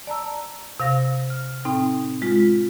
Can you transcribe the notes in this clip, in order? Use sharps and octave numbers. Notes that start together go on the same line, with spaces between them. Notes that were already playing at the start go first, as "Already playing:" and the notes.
D5 A5 A#5 E6
C3 F5 A#6
F6
A2 C4 D#4 G5
G#3 F4